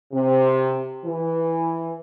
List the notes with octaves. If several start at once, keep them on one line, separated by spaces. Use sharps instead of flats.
C3
E3